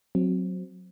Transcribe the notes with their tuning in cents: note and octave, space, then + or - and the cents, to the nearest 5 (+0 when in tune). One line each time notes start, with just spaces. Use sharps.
F#3 -10 C4 +0